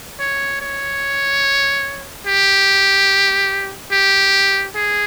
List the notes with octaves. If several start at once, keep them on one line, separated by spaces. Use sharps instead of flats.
C#5
C#5
G4
G4
G#4